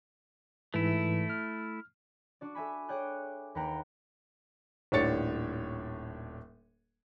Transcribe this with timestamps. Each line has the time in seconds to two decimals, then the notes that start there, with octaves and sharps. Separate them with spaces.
0.74 G#2 E3 A3 E4
1.30 F6
2.41 D4 F#4 D5
2.55 A4 E5 G#5 B5
2.89 G#4 C#5 D5 G5 F#6
3.55 D#2 A#3 B4 F#5 G5 A#5
4.92 D#1 A2 D4 C#5 A6 C#7